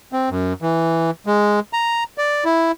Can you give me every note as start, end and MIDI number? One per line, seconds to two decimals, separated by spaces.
0.13 0.29 60
0.30 0.53 42
0.62 1.11 52
1.26 1.60 56
1.73 2.04 82
2.18 2.44 74
2.45 2.72 64